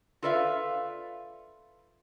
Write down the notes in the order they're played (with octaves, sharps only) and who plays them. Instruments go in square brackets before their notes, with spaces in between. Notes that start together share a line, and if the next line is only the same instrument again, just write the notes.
[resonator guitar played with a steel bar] F4 A4 B4 D5 E5 F5